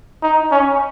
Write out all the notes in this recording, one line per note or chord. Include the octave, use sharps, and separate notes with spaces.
D#4
C#4